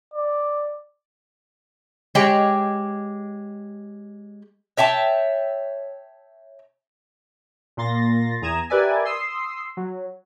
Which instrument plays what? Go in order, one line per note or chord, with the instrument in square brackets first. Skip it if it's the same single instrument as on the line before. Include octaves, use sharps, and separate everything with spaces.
[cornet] D5
[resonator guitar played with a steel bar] G#3 G4 C#5 G5
[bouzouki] C#5 E5 G5 A5
[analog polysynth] A#2 A#3 C6 A6 A#6
E2 A#5 D#6 G#6 E7
G4 A#4 B4 D5 E5 G#5
C6 D#6 E6 C7
F#3